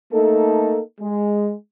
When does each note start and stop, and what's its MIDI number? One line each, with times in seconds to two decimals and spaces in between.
0.12 0.79 57
0.12 0.79 58
0.12 0.79 63
0.12 0.79 69
1.00 1.52 56